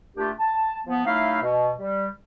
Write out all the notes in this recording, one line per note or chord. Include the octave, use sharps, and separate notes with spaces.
A#2 A3 D4 F4 G4
A5
F3 B3
F#3 A3 D#4 E4 E5 F5
B2
G3